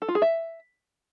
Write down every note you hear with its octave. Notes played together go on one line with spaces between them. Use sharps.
A4
F4
G#4
E5